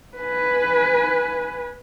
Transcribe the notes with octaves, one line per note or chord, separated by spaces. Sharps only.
B4 G#5